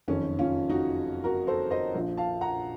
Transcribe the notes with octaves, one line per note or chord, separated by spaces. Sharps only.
F#1 F2 D#3 C#4
C#4 F4
D#4 F#4
F#4 A#4
A4 C5
C5 D#5
A#1 A#2 F3
F5 A5
F#5 A#5